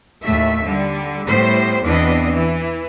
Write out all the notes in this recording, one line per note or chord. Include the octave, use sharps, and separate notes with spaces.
D#2 A2 A3 E5
D3 G3
A2 G3 B3 C5
E2 E3 B3 C4 D4 D#5
E3